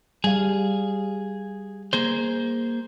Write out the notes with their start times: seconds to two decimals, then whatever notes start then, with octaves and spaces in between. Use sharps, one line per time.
0.24 G3 G#4 F5
1.93 A#3 G#4 C5